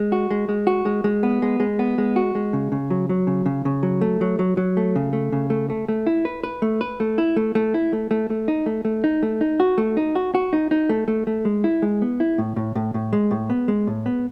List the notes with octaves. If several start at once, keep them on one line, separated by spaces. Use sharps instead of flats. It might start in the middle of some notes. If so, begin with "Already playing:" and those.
Already playing: G#3
F#4
G#3
G#3
F#4
G#3
G#3
B3
G#3
G#3
B3
G#3
F#4
G#3
C#3
C#3
F#3
F#3
C#3
C#3
C#3
F#3
A3
F#3
F#3
F#3
A3
C#3
A3
C#3
A3
A3
A3
E4
B4
B4
A3
B4
A3
E4
A3
A3
E4
A3
A3
A3
D#4
A3
A3
D#4
A3
D#4
F#4
A3
D#4
F#4
F#4
D#4
D#4
A3
A3
A3
G#3
E4
G#3
B3
E4
A2
A2
A2
A2
G#3
A2
B3
G#3
A2
B3